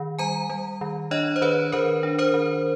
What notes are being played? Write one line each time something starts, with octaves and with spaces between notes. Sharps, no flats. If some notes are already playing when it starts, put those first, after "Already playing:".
Already playing: D#3
G3 G#5 A#5
G3
D#3
D4 C#5 D#5
C5
D#3 B4 C#5
D#3 A#4 C5
D4
A#4 C5
D#3